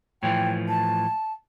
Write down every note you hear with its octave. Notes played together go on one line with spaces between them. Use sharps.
A2 E3 F3 G5
A5